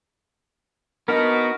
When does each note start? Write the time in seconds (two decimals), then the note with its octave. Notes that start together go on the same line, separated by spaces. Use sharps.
1.08 B3 D4 D#4 F#4 A#4